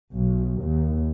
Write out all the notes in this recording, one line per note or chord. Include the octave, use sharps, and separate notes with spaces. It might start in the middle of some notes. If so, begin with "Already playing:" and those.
B1
D#2